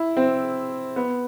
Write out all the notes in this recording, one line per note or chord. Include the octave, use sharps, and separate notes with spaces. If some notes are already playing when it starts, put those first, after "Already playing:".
Already playing: E4
C4
B3